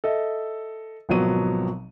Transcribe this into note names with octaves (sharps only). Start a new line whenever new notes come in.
A4 D#5 E5
G#1 B2 F3 F#3 D#7